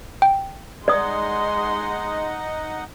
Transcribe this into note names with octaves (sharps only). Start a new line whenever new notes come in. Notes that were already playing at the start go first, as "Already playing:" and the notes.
G5
G#3 D#4 D5 D#5 F#5 C6 D#6